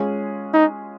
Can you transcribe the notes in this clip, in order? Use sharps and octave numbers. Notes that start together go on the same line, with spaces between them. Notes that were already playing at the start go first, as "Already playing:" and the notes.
Already playing: G#3 C#4 F4 G#4
D#4